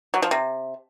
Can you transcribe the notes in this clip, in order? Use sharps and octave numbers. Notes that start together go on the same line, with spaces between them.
F#3
F3
C3